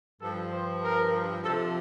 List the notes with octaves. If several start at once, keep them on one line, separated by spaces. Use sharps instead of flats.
G2 F3 A4
C5
A#4
C3 F3 A4